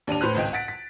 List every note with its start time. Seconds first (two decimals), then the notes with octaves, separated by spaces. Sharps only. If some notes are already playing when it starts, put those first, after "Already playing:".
0.07 D#2 D4 D#7 F7
0.21 A2 B4 C5 F#6
0.35 G#1 C#2 D#5 G5
0.53 F#5 A6 B6 D7
0.68 B6